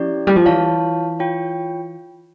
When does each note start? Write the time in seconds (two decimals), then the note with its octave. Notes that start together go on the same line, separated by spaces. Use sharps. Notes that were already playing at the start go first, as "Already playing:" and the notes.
Already playing: F3 C#4 E4 G4 D5
0.27 G3
0.36 F3
0.46 E3 F4 C#5 F5 A5
1.19 F4 C#5 G5